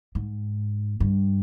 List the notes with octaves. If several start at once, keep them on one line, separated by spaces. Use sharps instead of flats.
G#2
G2